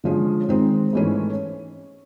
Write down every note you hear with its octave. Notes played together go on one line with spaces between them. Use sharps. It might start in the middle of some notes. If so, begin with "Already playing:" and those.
D3 F3 G#3 C#4
D#3 G#3 C4
G#2 E3 A3 C#4 E4